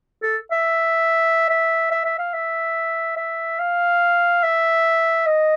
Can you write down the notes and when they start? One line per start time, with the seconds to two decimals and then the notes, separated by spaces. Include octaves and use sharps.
0.23 A4
0.52 E5
1.49 E5
1.91 E5
2.05 E5
2.19 F5
2.34 E5
3.17 E5
3.60 F5
4.43 E5
5.27 D#5